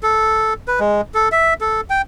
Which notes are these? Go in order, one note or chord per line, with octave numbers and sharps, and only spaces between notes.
A4
B4
G#3
A4
E5
A4
G5